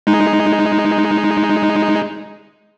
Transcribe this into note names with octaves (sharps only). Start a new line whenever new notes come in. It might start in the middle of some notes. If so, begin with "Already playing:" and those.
G#3 D#4